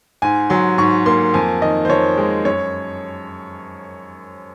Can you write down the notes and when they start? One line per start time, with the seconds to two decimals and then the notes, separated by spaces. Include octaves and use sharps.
0.22 G#2 G#5
0.50 F#3 C6
0.78 G#2 C#6
1.06 A#3 C6
1.34 F2 G#5
1.62 D#3 D#5
1.85 C5
1.89 F2 C#5
2.17 G#3
2.45 F#2 C#5